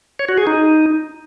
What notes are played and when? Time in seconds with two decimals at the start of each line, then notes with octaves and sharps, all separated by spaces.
0.19 C#5
0.29 F#4
0.38 G#4
0.47 D#4